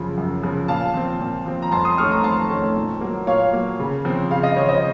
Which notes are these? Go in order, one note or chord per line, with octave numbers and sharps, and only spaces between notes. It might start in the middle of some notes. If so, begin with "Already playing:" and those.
Already playing: F#2 C#3 F3
F#2
C#3 F3
A#2 F5 A5
F3 C4
A#2
F3 C4
A#5
F2 A5 C6
C6 D#6
D#3 A3 C#4 C#6 F6
A#5 C#6
F2 A5 C6
D#3 A3 C#4
A#2
F#3 A#3
A#2 C#5 F5
F#3 A#3
C#3
F3 C4
C#3 F5
D#5
F3 C4 C#5
C5 D#5